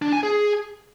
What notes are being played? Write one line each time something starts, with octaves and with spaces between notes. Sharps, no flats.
D4
G#5
G#4